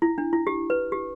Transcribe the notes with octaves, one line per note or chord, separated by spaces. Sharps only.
E4
D4
E4
G4
B4
G4